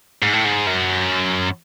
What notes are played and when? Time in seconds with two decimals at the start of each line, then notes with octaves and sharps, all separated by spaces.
0.23 G#2
0.33 A2
0.45 G#2
0.67 F#2